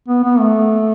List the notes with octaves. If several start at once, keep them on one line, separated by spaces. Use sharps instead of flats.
B3
B3
A3